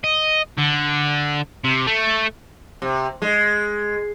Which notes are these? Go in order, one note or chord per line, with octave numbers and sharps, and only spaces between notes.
D#5
D3
C3
A3
C3
G#3